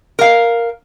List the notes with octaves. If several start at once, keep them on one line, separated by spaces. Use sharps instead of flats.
A#4 F5